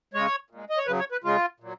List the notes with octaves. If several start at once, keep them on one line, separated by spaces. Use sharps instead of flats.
C#3 G#3 C#5
A#2 G#3
D#5
C#5
C#3 F#3 B4
C#5
B4
C#3 G#3 F4
A#2 F#3